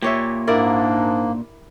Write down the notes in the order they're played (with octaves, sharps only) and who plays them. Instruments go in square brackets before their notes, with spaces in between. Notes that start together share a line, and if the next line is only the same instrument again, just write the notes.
[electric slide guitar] A#2 [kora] G4 C#5 E5
[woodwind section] G#2 D4 [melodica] A#3 [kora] E4 A#4 D5